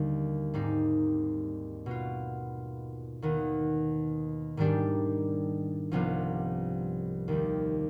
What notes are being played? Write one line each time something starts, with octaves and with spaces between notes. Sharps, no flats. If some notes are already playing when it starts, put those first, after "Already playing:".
Already playing: D#2 D3 G3
G#2 G3 C4 D#4
B2 B3 F4
D#2 D#3 B3
G#2 D#3 G3 D4 G4
C2 C3 F3 B3 F4
D#2 D#3 G3